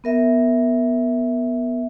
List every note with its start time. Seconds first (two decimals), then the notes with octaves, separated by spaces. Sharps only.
0.04 B3 A#4 E5